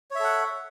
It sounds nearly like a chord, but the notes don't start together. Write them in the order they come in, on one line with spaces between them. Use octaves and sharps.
C#5 E5 A4 F#5